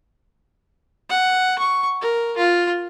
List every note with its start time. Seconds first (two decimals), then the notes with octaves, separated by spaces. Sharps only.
1.09 F#5
1.58 C#6
2.01 A#4
2.37 F4